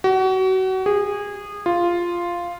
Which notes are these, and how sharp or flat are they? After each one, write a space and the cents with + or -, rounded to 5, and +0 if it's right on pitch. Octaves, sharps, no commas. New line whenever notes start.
F#4 +30
G#4 -25
F4 -5